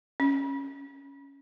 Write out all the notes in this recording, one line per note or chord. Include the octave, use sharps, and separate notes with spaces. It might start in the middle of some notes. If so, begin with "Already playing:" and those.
C#4